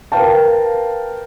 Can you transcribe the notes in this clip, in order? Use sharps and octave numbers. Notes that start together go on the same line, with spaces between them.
A#4 B4 F5 G5 A5